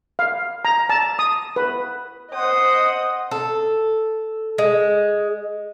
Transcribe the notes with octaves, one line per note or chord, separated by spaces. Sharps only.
F5
A#5
A5
D#6
B4
C5 D#5 F#5 D#6
A4
G#3